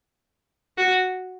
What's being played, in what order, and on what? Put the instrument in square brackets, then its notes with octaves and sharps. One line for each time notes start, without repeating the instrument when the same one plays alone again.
[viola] F#4